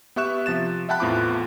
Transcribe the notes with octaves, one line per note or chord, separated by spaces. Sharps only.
B3 G4 E5 C#6 F#6 E7
C3 F3 A6 E7
E5 F#5 G5 A5 B5 F#6
E2 A2 B3 C4 F4 D6